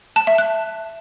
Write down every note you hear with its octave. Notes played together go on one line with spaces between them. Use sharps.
A5
E5
F#6